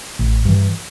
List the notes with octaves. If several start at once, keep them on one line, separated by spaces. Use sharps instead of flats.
A1
G2 E3